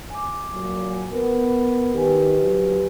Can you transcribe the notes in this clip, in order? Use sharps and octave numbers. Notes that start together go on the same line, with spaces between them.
G#5 D6
A#2 F#3
B3 A#4
D#3 G4 B4 G#5
D3 F3 F#3